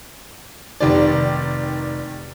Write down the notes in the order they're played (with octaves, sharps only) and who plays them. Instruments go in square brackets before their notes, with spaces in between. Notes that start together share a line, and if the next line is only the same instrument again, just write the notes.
[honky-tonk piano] F1 D#3 D5